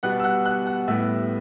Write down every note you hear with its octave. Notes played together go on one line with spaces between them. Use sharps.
B2 G3 B3 F#5 F#6
E6
F#5 F#6
F#5 F#6
F#5 F#6
A2 G3 B3 E5 E6